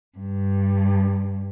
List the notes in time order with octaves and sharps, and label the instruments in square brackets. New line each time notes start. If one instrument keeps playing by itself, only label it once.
[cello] G2